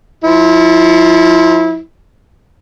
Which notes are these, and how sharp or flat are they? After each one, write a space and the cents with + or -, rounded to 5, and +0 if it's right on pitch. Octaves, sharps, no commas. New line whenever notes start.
F3 +0 E4 -25